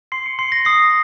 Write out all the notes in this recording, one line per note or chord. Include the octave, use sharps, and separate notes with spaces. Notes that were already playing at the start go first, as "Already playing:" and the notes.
C6 C7
C#7
C6 C7
A#6
D#6 C7